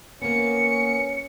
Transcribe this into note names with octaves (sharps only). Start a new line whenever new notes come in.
A#3 B3 C#4 C#7